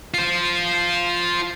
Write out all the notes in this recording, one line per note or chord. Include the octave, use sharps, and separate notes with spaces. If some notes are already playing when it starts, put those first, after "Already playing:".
F4 C5